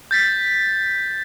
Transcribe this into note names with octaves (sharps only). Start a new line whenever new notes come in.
G6 A6 B6